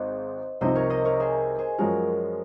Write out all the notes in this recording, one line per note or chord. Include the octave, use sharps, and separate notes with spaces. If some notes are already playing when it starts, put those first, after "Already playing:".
Already playing: G#1 G#2 C5 D#5
C2 C3 F3 C4 D#4 C5 D#5
A#4 C#5
C5 D#5
A#4 C#5
G#4 C5
G#4 C5
F#2 F3 G#3 F#4 A#4